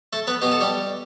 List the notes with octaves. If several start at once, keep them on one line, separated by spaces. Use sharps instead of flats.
A3 A4
B3 B4
B2 B3 G4
A4
G3 G4